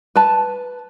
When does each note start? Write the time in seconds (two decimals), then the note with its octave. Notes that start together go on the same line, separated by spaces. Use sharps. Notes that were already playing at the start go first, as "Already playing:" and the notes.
0.16 B4 A5